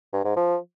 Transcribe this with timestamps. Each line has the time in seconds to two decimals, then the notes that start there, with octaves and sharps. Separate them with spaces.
0.13 G2
0.25 G#2
0.36 F3